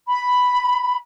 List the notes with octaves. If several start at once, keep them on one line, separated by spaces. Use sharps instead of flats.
B5